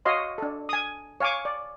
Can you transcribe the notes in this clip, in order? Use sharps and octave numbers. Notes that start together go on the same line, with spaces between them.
F#4 C#5 D#5 F5 C6
D4 A4
G#5 D#6
C#5 F5 G#5 C#6 D6
D5